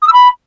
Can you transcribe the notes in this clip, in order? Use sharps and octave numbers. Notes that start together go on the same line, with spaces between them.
D#6
E6
B5